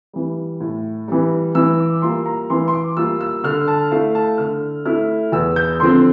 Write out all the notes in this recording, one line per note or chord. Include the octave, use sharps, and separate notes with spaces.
E3 G3
A2
E3 G3
E3 E6
D6
G3 A#3 F4 C6
A#5
E3 C6
C6
D6
G3 A#3 F4 E6
E6
D3 F6
A5
A3 E4 F5
A5
D3 F6
A3 E4 F6
E2 E6
G6
D3 F3 C4 C6